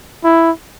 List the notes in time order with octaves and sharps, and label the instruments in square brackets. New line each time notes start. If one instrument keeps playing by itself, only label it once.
[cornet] E4